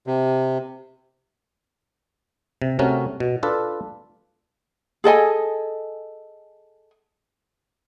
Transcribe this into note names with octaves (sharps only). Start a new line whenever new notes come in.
C3
C3
C3 A3 C#4 F#4 A#4
B2
D4 F4 A4 B4
G#4 A4 D#5 G#5